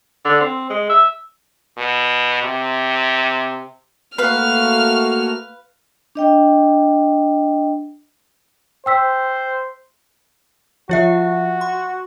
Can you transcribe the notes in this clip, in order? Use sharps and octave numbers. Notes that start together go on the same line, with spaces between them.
D3
C4
G#3
E5
B2
C3
A3 A#3 F#4 B4 F5 F6
D4 D#5 G5
C5 G5 E6 B6
F3 F4 F#4 E5
C6